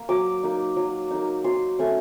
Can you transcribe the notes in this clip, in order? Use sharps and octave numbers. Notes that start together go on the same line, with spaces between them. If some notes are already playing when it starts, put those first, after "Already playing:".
Already playing: A#3
F#3 D6
A#3 D#4
F#3
A#3 D#4
F#3 C6
A3 C#4